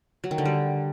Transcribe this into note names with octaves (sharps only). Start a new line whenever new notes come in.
F#3
D#3
D3
G3